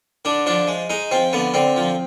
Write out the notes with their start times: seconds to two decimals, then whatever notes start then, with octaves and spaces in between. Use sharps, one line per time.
0.25 D3 D4
0.46 F3 D4
0.67 G#3
0.90 G#3 D#4
1.11 F3 C4
1.33 D3 B3
1.54 D3 C4
1.76 F3